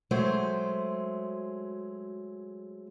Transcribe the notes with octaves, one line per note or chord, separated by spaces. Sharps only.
F#3 G#3 A3 C5